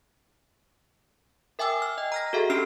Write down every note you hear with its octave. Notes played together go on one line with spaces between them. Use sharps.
A#4 E5 G5 G#5 D6 E6
F6
D#5 G5
A#5 F6 A#6
F#4 G#4 A4 E5 F#5
C#4 D4 G4 F6 C7 D7